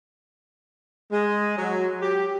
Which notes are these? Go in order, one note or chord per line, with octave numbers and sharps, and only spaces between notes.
G#3
F#3
G4